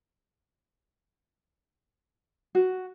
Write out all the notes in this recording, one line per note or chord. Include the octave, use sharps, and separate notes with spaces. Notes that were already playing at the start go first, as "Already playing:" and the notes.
F#4